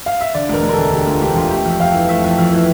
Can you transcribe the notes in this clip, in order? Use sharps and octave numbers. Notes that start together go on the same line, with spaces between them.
F5
E5
D3 D5
E1 A#4
E1
A#4
D2 A4
D3 G4
E1 F4
E1 G4
D2 F4
A3 G4
F2
F2 F5
E3
A3 E5
F2
F2
E3